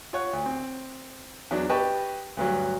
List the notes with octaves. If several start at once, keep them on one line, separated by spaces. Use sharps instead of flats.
F4 C#5 F#5
D2
C4
E2 F#3 D4
G4 B4 D#5 G5 A5 C#6
D2 G2 F#3